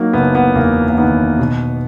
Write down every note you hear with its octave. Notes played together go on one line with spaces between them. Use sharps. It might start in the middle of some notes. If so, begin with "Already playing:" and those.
Already playing: F#3 A#3 D#4
F#1 B3
B3
E2 A#3
A#3
D#3 B3
B2